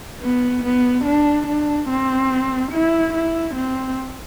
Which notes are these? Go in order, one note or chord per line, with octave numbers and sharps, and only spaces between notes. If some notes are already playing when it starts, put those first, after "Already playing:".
B3
B3
D4
D4
C4
E4
E4
C4